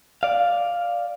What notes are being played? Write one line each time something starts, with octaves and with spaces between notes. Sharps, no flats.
D5 F5